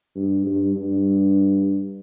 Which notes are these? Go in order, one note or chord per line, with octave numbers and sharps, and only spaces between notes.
G2
G2
G2